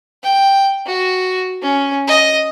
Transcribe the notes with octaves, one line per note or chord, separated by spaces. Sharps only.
G5
F#4
C#4
D#5